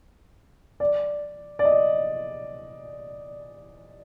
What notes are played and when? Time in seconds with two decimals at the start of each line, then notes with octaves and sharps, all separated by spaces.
0.80 D5
1.59 D5
1.65 D#5